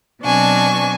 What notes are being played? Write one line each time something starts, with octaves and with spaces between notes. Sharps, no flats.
B2 F#3 C4 D4 G#5 C#6